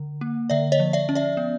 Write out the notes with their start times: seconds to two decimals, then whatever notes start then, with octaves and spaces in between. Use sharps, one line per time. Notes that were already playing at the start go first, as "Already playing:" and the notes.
Already playing: D3
0.21 A#3
0.50 D3 D5 E5
0.72 C#5 D#5
0.80 F3
0.93 D5 E5
1.09 C#4
1.15 D5 E5
1.37 B3